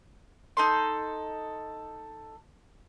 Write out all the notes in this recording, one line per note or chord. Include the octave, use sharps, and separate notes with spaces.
D#4 A4 C6